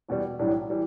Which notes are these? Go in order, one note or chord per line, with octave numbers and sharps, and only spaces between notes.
E2 B2 G3
B1 A2 E3 G3 D4
E3 G3